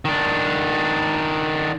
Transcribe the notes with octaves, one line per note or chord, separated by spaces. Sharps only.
D#3 D4